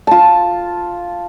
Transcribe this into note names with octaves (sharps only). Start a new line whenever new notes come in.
F4 A5